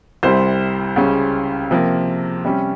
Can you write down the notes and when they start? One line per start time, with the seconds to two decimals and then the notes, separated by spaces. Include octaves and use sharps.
0.23 C2 C3 G3 C5
0.96 C#2 C#3 G3 C#4
1.71 C3 F3 A#3
2.45 C3 G3 C#4